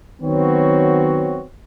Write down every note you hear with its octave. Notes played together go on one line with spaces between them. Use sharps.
D#3 F#3 B3 C4 F#4 C#5